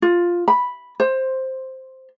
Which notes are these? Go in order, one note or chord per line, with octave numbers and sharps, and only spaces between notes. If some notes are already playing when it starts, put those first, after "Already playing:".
F4
B5
C5